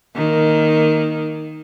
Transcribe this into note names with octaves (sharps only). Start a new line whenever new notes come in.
D#3 A#3